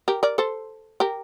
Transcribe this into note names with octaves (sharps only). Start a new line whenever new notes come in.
G4 A#4
A#4 D5
A4 C5
G4 A#4